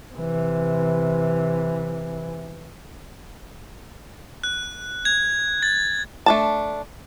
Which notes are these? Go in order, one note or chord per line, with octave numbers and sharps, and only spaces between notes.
C3 E3
F#6
G#6
A6
A3 D4 A5